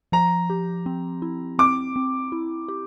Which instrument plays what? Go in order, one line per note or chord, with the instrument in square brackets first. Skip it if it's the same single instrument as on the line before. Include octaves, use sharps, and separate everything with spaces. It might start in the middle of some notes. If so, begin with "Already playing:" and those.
[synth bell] F3 [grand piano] A#5
[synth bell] G4
C4
E4
[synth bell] C4 [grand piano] D6
[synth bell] C4
E4
G4